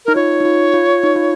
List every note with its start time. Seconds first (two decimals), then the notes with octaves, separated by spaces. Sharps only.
0.05 D#4 A#4
0.15 F4 C#5
0.40 D#4
0.45 F4
0.74 F4
1.03 D#4
1.16 F4